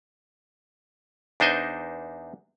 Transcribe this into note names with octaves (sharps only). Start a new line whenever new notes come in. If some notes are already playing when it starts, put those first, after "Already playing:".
E2 D4 D#4 C5 D#5 G#5